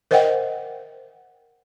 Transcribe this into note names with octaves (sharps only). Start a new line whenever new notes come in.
A#4 C5 D#5 E5 F#5 G5